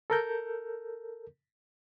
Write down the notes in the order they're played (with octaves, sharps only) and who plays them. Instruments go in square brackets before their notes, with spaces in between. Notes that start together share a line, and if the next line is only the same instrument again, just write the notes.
[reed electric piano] A4 A#4 G6